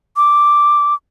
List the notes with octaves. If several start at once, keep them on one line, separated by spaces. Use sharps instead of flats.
D6